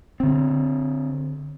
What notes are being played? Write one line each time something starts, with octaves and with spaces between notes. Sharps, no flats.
D3 C4